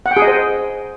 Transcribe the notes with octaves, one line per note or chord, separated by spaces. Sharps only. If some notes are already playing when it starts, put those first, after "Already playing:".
F#5
G5
G#4
D#5
C5